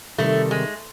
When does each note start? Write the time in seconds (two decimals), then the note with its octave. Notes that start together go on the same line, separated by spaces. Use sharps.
0.18 C3 D#3 G3 A3
0.51 G#3